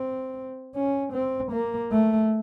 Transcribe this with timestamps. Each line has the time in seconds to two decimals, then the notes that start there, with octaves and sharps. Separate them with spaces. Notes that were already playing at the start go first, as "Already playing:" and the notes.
Already playing: C4
0.76 C#4
1.13 C4
1.52 A#3
1.92 A3